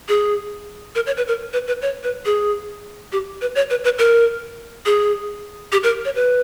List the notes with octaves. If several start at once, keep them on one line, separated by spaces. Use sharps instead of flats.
G#4
A#4
C#5
B4
A#4
B4
B4
C#5
B4
G#4
G4
B4
C#5
B4
B4
A#4
G#4
G4
A#4
C#5
B4